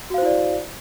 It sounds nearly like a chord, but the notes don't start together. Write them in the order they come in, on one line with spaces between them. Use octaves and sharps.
F#4 F5 C5 E4 D5